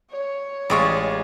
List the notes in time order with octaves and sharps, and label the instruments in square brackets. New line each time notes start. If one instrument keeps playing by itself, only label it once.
[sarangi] C#5
[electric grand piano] A1 G#4 C#6 [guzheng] G3 G#3 F4